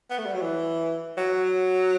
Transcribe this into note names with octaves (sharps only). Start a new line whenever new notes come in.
B3
A3
G3
F#3
E3
F#3